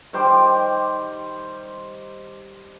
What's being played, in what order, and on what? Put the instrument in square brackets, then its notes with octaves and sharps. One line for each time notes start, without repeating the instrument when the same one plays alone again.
[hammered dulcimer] D#3 G3 C5 D6